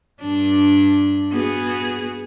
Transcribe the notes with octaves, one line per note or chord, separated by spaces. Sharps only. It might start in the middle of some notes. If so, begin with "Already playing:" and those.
G2 D4
B3 F#4 G#4